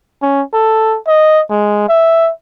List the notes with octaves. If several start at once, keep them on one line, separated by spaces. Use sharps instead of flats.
C#4
A4
D#5
G#3
E5